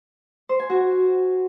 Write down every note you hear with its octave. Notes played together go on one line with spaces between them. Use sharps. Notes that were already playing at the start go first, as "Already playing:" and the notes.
C5
G#5
F#4